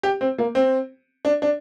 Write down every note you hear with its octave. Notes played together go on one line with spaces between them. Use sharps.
G4
C4
A#3
C4
D4
D4